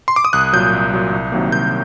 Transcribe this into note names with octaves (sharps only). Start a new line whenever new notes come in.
C6
D6
D#6
C2 F#6
A#2 F#3 G6
C2
A#2 F#3
C2
C3 D#3 F#3 A#3
C2 G6